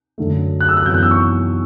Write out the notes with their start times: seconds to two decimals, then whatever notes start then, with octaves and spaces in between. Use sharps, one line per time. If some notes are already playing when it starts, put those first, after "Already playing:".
0.18 F#2 D3 F#3 A3
0.61 F#6
0.69 E6
0.77 F#6
0.86 F#2 E3 B3 G6
0.94 F#6
1.03 E6
1.11 C#6